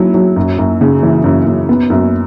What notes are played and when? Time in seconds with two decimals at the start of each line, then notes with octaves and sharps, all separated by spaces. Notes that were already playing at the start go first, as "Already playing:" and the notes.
Already playing: F#3 E4
0.14 F#3
0.36 F#2
0.58 F#2
0.81 C#3
1.02 E3
1.24 F#2
1.46 F#2
1.69 B3
1.90 F#2